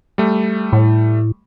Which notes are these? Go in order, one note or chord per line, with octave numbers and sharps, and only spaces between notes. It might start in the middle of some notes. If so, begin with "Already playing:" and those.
G3 A3
A2